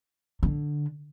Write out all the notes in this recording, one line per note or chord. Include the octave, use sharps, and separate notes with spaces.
D3